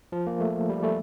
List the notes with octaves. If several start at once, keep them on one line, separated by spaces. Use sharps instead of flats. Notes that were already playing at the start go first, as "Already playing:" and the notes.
F3
A#3
A3
G3
A3